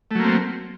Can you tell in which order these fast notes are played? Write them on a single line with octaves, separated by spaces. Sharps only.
A3 F#3 A#3 C4